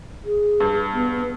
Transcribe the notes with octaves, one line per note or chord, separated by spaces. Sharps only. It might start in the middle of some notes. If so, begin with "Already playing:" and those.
G#4
G2
B3